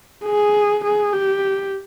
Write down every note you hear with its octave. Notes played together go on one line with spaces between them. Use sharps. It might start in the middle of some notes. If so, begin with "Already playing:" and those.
G#4
G#4
G4